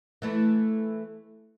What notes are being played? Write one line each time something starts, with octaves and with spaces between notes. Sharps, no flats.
E3 A3 E4